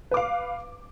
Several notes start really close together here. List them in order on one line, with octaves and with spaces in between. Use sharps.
B4 D6 F5